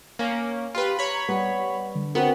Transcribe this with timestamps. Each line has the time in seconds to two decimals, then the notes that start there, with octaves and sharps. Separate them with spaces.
0.19 A#3 C#4
0.75 F4 G4 B4
0.99 C#5 A#5 B5
1.29 G3 B3
1.95 D3
2.15 B3 C4 F#4 A#4